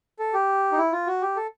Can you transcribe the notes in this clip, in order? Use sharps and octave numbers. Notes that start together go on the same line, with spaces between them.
A4
G4
D#4
E4
F4
F#4
G4
A4